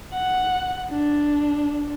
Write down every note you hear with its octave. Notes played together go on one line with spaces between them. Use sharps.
F#5
D4